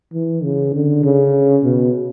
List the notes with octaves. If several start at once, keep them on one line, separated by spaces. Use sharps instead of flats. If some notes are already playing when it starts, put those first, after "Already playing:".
E3
C#3
D3
C#3
B2